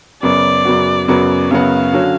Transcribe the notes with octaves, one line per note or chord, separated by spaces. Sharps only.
F#2 C#3 F#3 B3 F#4 D5
F#2 C#3 F#3 B3 F#4
F#2 C#3 F#3 B3 F#4 D5
F#2 C#3 F#3 B3 F#4 F5
D3 F#3 C#4 F#4